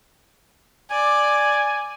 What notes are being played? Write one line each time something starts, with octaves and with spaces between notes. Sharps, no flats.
D5 G#5